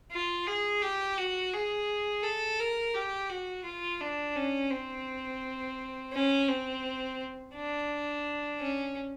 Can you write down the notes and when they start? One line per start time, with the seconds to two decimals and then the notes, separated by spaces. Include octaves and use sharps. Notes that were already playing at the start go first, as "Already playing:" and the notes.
0.12 F4
0.47 G#4
0.83 G4
1.18 F#4
1.54 G#4
2.23 A4
2.60 A#4
2.95 G4
3.29 F#4
3.65 F4
4.01 D4
4.36 C#4
4.71 C4
6.13 C#4
6.49 C4
7.55 D4
8.60 C#4